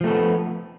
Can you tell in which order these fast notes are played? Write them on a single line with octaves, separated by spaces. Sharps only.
F3 A3 A4 B3